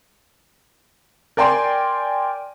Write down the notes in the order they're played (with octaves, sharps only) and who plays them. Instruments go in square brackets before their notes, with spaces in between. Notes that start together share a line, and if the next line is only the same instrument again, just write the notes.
[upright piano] A#4 D5 G5 G#5 C6